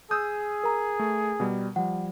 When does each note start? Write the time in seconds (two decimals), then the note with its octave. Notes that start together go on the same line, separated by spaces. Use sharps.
0.11 G#4 D#6 E6 G6
0.63 A#4 A#5
0.99 A3
1.40 B2 G3
1.76 F3 G3 F#5